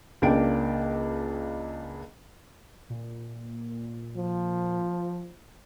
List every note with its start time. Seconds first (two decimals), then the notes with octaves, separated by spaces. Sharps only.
0.22 C#2 A#3 D4 G5 D7
2.90 A#2
4.16 F3